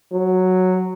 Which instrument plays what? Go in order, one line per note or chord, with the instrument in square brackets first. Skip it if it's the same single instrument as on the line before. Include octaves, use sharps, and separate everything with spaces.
[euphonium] F#3